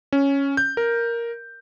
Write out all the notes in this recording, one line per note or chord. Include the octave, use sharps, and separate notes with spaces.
C#4
G6
A#4